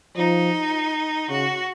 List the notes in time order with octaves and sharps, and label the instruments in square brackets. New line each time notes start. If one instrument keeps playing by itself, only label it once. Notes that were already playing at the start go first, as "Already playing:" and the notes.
[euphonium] F3 [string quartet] D#4
[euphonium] C#3 [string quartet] F#4